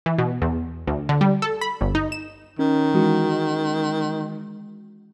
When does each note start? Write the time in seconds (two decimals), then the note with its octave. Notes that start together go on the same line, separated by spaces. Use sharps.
0.06 E3
0.18 B2
0.42 E2
0.87 D2
1.09 D3
1.21 G3
1.42 A4
1.61 B5
1.81 G1
1.95 D#4
2.12 E7
2.59 D#3 C#4
2.94 E3 G#3 F#4